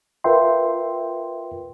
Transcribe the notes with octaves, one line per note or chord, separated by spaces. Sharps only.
F4 A#4 B4 E5 G5 C6